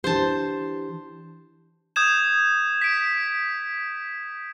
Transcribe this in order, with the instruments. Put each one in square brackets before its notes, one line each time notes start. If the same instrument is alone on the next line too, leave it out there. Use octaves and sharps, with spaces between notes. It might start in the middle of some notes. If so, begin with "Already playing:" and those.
[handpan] E3 D4 G4 [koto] C5 A5
[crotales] D#6 G6 G#6 E7
B6 D7